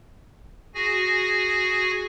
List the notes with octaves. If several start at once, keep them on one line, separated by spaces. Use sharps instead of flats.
F#4 G#4 G#5 A#6